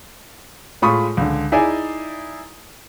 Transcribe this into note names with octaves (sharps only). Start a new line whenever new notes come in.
A2 G#3 F4 B5 C#6 D#6
C#2 D3
D#4 E4 G#4 D5 G#5